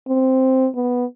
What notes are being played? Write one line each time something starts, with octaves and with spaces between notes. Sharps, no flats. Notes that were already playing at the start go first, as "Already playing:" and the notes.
C4
B3